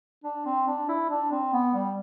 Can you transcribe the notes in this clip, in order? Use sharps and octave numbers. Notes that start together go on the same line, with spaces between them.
D4
C4
D4
E4
D4
C4
B3
G3